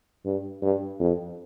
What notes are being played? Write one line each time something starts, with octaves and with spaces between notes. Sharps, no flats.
G2
G2
F2